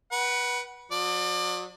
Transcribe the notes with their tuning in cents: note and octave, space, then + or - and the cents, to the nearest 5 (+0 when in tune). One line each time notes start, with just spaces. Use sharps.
B4 -25 F#5 +15
F#3 -35 D5 +30